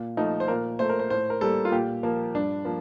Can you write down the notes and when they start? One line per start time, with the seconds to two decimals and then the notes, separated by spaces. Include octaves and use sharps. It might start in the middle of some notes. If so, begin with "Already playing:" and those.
Already playing: A#2
0.17 F3 A3 D#4
0.40 C5
0.48 A#2 A#4
0.79 A3 C5
0.89 A#4
0.99 C5
1.10 A2 C5
1.30 A#4
1.41 G3 A#3 A4
1.65 F4
1.72 A#2 G4
2.03 F3 A#3
2.34 G2 D4
2.65 F3 A#3